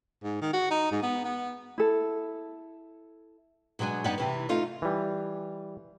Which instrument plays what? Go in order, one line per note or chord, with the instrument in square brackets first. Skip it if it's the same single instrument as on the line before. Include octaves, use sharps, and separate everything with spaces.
[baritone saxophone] G#2
D#3
F#4
D#4
G#2
B3
B3
[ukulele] E4 A4
[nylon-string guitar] B2 F#3 G#3 D4 G#5
G2 B3 D#4 D5 F#5
C3 E3
A3 D#4 F4
[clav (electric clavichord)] E3 G3